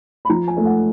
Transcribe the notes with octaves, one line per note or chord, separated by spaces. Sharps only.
B5
F3 A#5
G#5
A3
F#5